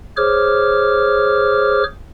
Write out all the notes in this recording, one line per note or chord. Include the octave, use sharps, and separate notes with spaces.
G#4 C5 C#5 D6 F6